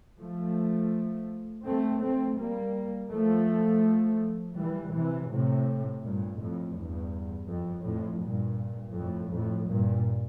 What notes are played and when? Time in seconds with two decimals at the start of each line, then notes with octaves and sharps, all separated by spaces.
0.19 F3 A3
1.66 A3 C4
2.01 A3 C4
2.38 G3 A#3
3.11 F3 A3
4.57 E3 G3
4.93 C3 E3
5.30 A2 C3
6.03 G2 A#2
6.40 F2 A2
6.76 E2 G2
7.49 F2
7.85 F2 A2
8.22 G2 A#2
8.95 F2 A2
9.32 F2 A2
9.68 G2 A#2